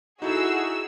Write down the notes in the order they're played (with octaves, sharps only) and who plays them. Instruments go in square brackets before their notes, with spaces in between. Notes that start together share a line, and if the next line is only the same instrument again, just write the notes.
[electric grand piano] D#4 E4 A4 [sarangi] F#4 [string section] G#4 E6